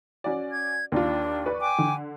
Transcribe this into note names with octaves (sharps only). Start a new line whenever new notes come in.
C#4 F#4 D5
G#6
D#2 D4 F4
B4 D5 C#6
G5 G#5 D6
D3